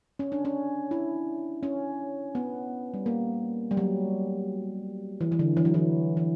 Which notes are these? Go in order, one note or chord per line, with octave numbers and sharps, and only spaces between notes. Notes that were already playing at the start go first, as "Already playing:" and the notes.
C#4
D4
C#4
E4
C#4
B3
G3
A#3
G3
F#3
E3
E3
D3
E3
F#3
E3
E3